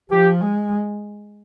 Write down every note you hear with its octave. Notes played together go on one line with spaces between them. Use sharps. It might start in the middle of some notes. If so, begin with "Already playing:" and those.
F3 G4
G#3